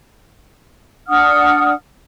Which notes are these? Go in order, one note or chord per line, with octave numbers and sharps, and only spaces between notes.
D4 F#5 D#6 F6